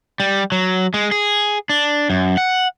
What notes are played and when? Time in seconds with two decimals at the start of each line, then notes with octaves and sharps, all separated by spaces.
0.20 G3
0.52 F#3
0.94 G#3
1.11 G#4
1.70 D4
2.10 F#2
2.37 F#5